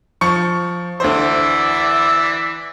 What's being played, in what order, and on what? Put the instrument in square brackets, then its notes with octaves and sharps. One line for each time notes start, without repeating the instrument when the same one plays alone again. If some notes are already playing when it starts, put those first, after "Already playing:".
[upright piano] F3 C#6 C#7
[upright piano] D2 C5 [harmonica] E3 D5 E5